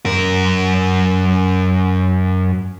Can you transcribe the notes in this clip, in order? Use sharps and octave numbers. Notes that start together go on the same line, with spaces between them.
F#2 A#4